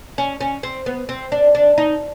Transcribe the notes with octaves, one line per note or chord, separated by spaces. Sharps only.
C#4
C#4
C4
B3
C4
D4
D4
D#4